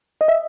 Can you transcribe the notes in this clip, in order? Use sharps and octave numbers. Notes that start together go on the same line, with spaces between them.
D#5
E5